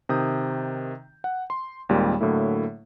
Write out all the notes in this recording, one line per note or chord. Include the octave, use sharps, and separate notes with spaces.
C3 D#3 D#6 G6
F#5
C6
D#2 A#2 G3 G#3 C4
A2 D3 F#3 A3 A#3 E4